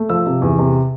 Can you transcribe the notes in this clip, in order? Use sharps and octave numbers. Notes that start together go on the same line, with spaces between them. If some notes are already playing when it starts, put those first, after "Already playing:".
Already playing: A3
F3 E6
C3
E2
C3